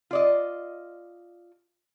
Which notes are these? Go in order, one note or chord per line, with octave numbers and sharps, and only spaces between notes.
F4 D5 D#5